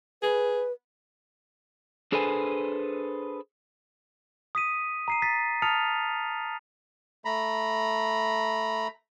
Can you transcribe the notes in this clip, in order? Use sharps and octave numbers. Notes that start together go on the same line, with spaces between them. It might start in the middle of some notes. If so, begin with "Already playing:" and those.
G#4 B4
D4 G#4 A4 B4 C5 G#5
D#6 B6 D#7
A#5 C7 D#7
A6 B6
A5 D#6 F6 A6 C#7 F7
A3 A#5 B5